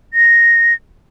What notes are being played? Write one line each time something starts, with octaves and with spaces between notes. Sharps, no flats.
A#6